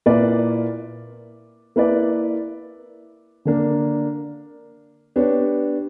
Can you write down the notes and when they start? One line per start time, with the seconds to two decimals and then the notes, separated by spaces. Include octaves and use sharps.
0.06 A#2 A#3 E4 B4 D5
1.76 A#3 E4 B4 D5
3.45 D3 A#3 D4 A#4
5.16 B3 D4 G4 C#5